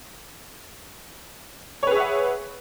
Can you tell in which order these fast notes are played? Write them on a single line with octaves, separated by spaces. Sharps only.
C#5 B4 G#4 E5 F#5